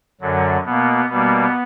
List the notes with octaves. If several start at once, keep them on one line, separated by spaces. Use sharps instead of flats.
F#2 D3 F#3
B2 A#3 B3
B2 G3 A#3 B3